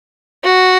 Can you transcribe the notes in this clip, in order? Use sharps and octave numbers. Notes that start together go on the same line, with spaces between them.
F#4